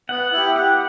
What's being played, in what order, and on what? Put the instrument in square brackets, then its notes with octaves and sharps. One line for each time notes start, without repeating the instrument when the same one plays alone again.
[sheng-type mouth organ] B3 [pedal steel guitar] F#5
[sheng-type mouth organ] E4 G4
[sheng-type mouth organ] G4 [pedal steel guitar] F#5